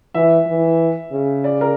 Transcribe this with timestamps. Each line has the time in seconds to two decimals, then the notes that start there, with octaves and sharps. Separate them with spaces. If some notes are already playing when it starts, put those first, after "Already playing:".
0.14 E3 E5
0.47 E3
1.12 C#3
1.44 D5
1.61 A#4